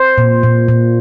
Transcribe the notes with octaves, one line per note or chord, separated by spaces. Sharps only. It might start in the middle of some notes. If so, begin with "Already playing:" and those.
Already playing: C5
A#2
A#2
A#2